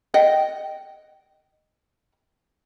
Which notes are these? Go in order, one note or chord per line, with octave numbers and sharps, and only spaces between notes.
D#5 F#5 G5